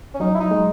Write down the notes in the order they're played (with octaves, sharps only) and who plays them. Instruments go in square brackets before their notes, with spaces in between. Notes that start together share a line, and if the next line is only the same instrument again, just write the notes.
[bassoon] C#4
[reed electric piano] F#3 [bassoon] D#4
[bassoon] E4
D#4
[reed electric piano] G#3